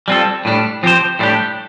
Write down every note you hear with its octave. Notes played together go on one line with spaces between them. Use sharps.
G3 C4 F4 A4
A2 G3 D4
F3 C4 G4 C5
A2 G3 D4 G4